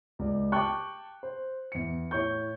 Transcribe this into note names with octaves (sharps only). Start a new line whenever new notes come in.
C#2 D5
G5 A5 C#6 D6 F#6
C5
E2 C#7
A2 C#5 C#6 G6